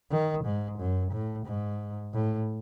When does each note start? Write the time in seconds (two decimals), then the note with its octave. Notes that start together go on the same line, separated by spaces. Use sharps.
0.11 D#3
0.44 G#2
0.79 F#2
1.12 A2
1.47 G#2
2.13 A2